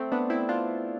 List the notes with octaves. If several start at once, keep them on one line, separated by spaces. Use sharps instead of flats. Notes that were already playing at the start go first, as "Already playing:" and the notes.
Already playing: A3 C4
B3 D4
C4 E4
D4 F4